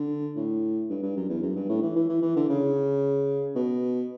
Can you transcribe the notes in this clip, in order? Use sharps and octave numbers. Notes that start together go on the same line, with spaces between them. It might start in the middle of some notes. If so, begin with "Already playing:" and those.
Already playing: D3
A2
G2
G2
F#2
E2
F#2
G2
A2
E3
E3
E3
E3
D3
C#3
B2